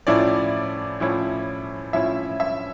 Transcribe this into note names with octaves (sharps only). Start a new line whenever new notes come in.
A2 F3 C#4 E4 D5
A2 F3 C#4 E4
A2 F3 C#4 E4 E5
E5